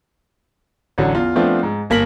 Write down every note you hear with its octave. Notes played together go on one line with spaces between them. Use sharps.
A1 D3 F#3
E2 F4
F3 A3 B3 C4 D4 F4
G#2
G1 A#3 A#4 B6 F#7